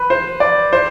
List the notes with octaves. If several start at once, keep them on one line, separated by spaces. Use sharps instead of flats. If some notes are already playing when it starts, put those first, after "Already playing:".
Already playing: B4
C5
D5
C5